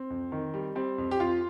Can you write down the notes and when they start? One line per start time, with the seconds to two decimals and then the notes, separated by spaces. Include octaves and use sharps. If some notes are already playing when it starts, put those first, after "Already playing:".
Already playing: C4
0.10 F2
0.32 D#3
0.54 G3
0.75 G3 C4
0.98 F2
1.11 G4
1.20 F2 F4